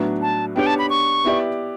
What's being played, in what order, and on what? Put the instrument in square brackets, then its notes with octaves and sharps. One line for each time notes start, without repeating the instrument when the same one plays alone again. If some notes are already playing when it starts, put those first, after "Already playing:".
Already playing: [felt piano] A2 F#3 B3 D4
[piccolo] A5
[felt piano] B3 D4 G4 C#5 [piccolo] G5
[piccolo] A5
B5
C#6
[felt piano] B3 E4 G4 D5